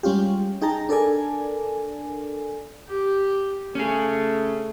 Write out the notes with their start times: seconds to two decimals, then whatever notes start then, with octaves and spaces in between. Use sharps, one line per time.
0.03 G3 G#3 C#4 F4 G4
0.62 D#4 G#4 G5 A5 A#5
0.89 D4 A4 A#4 D5 G#5
2.88 G4
3.75 A3 C#4 G#4